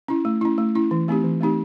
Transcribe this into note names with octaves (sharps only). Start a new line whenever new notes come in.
C#4 E4
A3
C#4 E4
A3
C#4 E4
E3
A3 C4 D#4 G4
E3
A3 C4 D#4 G4